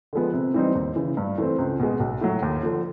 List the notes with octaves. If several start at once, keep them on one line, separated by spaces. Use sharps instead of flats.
D3 F3 G#3 B3
C3
E3 G3 C4 D#4
D#2
C#3 E3
G2
E3 A3 C4
C#2
B2 G#3
B1
A2 F#3
D#2
D3 F3